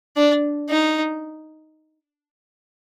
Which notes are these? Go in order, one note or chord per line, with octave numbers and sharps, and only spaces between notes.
D4
D#4